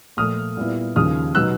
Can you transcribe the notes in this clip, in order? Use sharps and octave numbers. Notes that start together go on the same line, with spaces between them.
A#2 F3 A3 D#6 F6
A#2 G3 B3 E4
D#2 C#3 F3 D#6 F6
B2 F#3 B3 D#4 E6 F#6